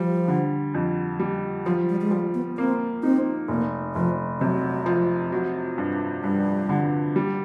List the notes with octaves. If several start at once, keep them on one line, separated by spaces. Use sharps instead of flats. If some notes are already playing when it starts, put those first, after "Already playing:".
Already playing: F3 G3
D3
F2
G3
F3 F#3
G3
G#3
F3 G3
B3
A#3 C4
C4 D#4
F1 A#3
F1 F3
C3 F#3
F3
F#3
G2
G2 G3
D3
G3